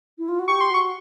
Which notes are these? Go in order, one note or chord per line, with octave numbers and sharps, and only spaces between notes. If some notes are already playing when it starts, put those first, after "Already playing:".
E4
F4
F#4
G4 C#6
C6
F#4 C#6